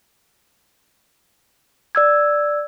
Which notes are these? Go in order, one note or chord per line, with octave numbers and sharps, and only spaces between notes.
D5 E6 G#6